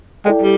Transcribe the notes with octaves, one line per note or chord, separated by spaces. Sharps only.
G#3 E4 A4 D5 G5
G3